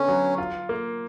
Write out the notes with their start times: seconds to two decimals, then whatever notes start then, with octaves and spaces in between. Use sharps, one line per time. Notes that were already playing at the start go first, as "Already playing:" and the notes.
Already playing: D3 B3 C#4
0.08 F#3
0.38 F4
0.69 A#3